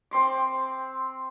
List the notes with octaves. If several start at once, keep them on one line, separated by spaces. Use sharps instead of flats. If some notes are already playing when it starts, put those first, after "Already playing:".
C4 C6 D6